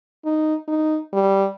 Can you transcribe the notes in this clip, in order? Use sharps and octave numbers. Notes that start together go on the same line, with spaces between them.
D#4
D#4
G3